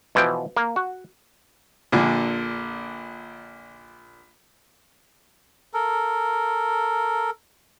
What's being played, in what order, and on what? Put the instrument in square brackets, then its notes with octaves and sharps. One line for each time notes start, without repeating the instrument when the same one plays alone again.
[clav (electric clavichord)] B2 E3 F3 G5
A#3
F#4
[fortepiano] A#1 A#2 D3
[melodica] A4 A#4